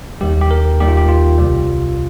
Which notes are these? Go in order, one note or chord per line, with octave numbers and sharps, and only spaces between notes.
D#2 D#3 G3 G4
G4
A#4
D#2 D#3 G3 G4
F4
G4
F4
C2 C3 G3